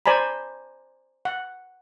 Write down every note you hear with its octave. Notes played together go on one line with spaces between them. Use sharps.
C5 D5 G#5 A#5 B5
F#5